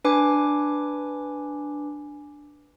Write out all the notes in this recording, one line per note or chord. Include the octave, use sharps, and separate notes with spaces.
D4 B4 G#5 D6